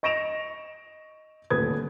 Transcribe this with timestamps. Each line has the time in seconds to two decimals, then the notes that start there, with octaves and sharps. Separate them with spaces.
0.03 D#5 C#6 A#6 D7 E7 F7
1.50 D#1 D2 B4 D#6 G#6